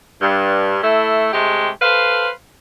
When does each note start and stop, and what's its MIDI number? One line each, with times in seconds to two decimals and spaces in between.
0.21 0.77 43
0.83 1.29 57
0.83 1.29 64
1.32 1.69 48
1.32 1.69 56
1.32 1.69 57
1.32 1.69 67
1.81 2.28 69
1.81 2.28 71
1.81 2.28 72
1.81 2.28 77